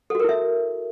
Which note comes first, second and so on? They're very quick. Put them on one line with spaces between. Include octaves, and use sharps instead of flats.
A4 F#4 A#4 E4 E5